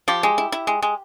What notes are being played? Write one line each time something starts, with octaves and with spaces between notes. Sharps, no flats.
F3 G4
G#3
E4
E4
G#3
G#3